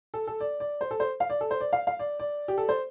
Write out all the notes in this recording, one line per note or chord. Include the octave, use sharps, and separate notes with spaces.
A4
A4
D5
D5
C5
A4
C5
F5
D5
A4
C5
D5
F5
F5
D5
D5
G4
A4
C5